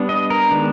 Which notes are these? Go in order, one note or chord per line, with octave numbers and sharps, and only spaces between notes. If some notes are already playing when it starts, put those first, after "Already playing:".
Already playing: G3 B3 D4
D#5
A#4
D#3 G#3 B3 D4